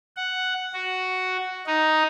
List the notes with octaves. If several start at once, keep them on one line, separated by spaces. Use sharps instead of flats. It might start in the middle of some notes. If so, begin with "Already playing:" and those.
F#5
F#4
D#4